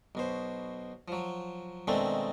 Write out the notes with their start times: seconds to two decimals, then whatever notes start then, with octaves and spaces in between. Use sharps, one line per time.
0.15 B1 B2 C5
1.08 F3 F#3
1.88 B2 D#3 G#3 A3 C4 D4